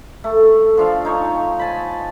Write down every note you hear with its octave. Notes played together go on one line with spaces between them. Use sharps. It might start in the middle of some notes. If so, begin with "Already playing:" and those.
A3
F3 D4 F5
D#4 C#5
G#5 A5 B5